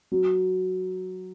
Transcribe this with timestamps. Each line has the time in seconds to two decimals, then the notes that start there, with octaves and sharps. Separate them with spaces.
0.12 F#3